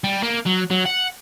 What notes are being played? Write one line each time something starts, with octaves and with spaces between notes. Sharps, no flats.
G3
A#3
F#3
F#3
F#5